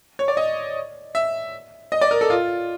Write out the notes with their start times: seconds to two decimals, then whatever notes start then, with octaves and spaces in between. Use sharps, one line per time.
0.19 C#5
0.28 D5
0.37 D#5
1.15 E5
1.92 D#5
2.01 D5
2.11 A#4
2.21 A4
2.30 F4